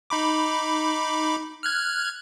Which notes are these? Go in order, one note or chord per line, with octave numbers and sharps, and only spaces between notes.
D#4 B5 D6
F6 F#6 G#6